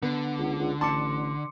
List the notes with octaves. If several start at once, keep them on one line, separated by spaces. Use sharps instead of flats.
D3 B3
C#2
C#2
A1 A5 C6 D6 C#7